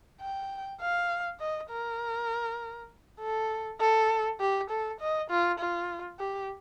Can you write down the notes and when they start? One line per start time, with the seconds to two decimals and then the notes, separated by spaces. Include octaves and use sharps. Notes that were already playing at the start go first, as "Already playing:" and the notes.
0.21 G5
0.81 F5
1.40 D#5
1.71 A#4
3.21 A4
3.80 A4
4.40 G4
4.70 A4
5.00 D#5
5.30 F4
5.60 F4
6.19 G4